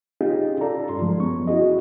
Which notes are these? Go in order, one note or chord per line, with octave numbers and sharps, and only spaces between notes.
C#4 D#4 F4 G4 G#4
F4 A4 D5 A#5
G2 C6
F3 G#3
F#2 B3 C#4 C#6
E4 F#4 G#4 D#5